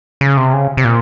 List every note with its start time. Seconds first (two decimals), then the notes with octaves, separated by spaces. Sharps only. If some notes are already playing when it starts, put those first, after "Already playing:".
0.21 C#3
0.37 C3
0.53 C#3
0.77 C3
0.85 A#2